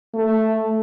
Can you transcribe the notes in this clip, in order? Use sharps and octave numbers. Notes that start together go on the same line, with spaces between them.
A3